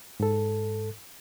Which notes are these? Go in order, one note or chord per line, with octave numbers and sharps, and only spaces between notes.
G#2 A4